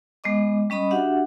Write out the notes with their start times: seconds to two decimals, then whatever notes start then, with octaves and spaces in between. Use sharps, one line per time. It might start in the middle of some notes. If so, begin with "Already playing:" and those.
0.24 G#3 B3 D#5 D6
0.70 G3 C#4 D#5 B5 D#6
0.91 D4 F#4 G4 E5 F#5